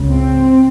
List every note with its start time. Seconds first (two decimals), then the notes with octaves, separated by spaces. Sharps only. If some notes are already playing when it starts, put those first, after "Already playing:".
Already playing: C#2 C#3
0.12 C4